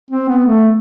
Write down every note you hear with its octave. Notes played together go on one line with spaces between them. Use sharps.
C4
B3
A3